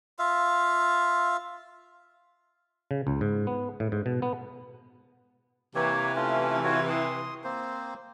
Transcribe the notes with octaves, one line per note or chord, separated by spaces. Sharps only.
F4 E5 F5
C#3
C#2
G#2
B3
A2
G#2
B2
B3
C3 E3 A#3 G4 C#5
A3 C#4 F4
F4 F#4 C#5
C6 D#6
A#3 C4 C5